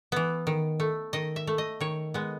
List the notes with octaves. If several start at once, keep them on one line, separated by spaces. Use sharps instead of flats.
E3 B3
D#3
A3
D#3 D#5
E5
A3
D#5
D#3 C#5
G#3 B3